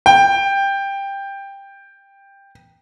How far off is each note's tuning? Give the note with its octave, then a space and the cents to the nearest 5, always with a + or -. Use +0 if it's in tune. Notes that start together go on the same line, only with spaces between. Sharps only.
G5 +10